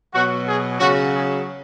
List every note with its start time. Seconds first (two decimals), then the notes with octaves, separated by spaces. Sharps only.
0.14 B2 F#3 F#4
0.47 G#4
0.79 C#3 F#3 F#4
1.13 G#4